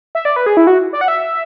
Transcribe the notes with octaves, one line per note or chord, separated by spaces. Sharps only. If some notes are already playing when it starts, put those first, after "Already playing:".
E5
D5
B4
G#4
E4
F#4
D5
F#5
E5